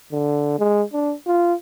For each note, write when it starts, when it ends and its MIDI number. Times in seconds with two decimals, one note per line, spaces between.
0.12 0.56 50
0.59 0.83 56
0.93 1.14 62
1.27 1.54 65